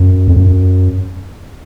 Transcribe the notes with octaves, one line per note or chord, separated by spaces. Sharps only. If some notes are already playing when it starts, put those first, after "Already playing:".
Already playing: F#2
F2
F#2